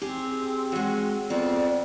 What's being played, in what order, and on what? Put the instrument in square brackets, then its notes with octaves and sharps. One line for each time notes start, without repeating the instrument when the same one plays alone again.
[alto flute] C4 [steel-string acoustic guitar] G4 G#4
[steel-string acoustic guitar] F#3 G#3 [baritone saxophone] F#4
[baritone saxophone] F2 [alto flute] B3 [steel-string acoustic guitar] C4 [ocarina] D5